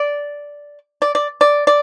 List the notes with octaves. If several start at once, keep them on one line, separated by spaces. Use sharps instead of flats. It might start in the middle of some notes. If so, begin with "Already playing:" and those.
Already playing: D5
D5
D5
D5
D5